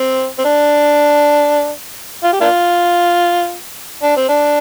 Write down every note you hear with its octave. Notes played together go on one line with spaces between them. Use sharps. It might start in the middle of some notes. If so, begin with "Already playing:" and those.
Already playing: C4
C4
D4
F4
G4
A#3 D4 F4
D4
C4
D4